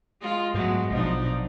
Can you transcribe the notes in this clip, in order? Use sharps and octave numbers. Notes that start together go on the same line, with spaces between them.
G#3 F4
G#2 F#3 G#3 A3 B3
A#1 B2 F3 F#3 D4 D#4